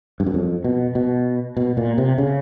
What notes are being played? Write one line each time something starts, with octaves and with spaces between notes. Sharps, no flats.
G2
F#2
F2
B2
B2
B2
A#2
C3
C#3